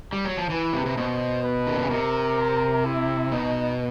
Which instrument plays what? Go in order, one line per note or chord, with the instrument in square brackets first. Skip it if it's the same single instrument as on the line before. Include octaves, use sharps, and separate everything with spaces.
[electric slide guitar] G3
F#3
F3
[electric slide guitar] E3 [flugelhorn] B4
[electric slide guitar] C3
C3
[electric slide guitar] B2 [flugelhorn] C5
[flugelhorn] B4
[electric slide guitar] D#3
D3
C#3
[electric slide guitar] C3 [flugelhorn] A#4
[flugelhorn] E4
[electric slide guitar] B2 [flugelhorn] D#4